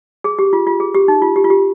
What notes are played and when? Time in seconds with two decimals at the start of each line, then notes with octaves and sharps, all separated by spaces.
0.24 G#4
0.39 G4
0.53 F4
0.67 F4
0.80 G#4
0.94 G4
1.08 D#4
1.22 F4
1.36 G4
1.44 F4
1.50 G4